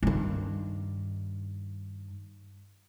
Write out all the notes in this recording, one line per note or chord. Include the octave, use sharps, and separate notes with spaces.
G2 D#3